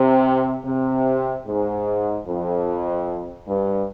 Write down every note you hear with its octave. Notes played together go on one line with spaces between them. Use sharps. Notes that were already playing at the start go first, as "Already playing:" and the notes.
Already playing: C3
C3
G#2
F2
G2